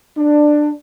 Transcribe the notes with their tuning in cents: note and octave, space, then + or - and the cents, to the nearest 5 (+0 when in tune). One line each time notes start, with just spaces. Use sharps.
D4 +15